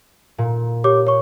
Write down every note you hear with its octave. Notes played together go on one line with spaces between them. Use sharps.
A#2
G4 C#5 D6
C#5 C#6